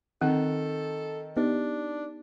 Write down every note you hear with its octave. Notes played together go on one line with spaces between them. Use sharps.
D#3 C4 A4
B3 D4 D#4 G4